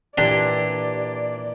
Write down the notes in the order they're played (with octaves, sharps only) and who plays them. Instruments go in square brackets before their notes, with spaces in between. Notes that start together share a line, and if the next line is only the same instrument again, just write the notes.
[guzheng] A#2 E3 [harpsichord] D4 G4 [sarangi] D5